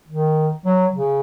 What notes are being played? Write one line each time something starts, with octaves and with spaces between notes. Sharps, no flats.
D#3
F#3
C#3